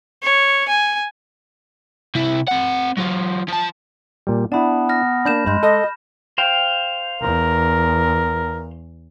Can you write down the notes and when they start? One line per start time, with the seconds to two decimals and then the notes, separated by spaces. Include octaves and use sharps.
0.23 C#5
0.68 G#5
2.15 C3 E4
2.48 C4 F#5
2.97 F#3 F4
3.48 F3 A5
4.27 A#2 G3
4.52 B3 D4 E4 A5 B5
4.89 F6 A#6
5.25 A#3 D4 B5 G6 E7
5.46 G2 G#3 B5 G6
5.63 A4 D#5
6.38 C5 F5 G5
7.22 E2 A#4